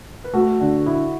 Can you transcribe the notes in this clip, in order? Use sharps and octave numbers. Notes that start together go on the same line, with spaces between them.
B4
A3 F#4 A4
D3
E4